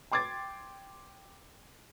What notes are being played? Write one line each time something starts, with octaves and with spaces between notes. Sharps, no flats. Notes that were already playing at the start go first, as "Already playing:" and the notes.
G5 C6 D6 G#6 A6